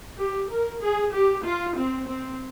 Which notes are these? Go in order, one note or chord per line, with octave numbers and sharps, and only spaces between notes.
G4
A#4
G#4
G4
F4
C4
C4